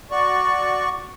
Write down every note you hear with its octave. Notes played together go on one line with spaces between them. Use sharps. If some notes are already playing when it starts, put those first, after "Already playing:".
F#4 D5 C#6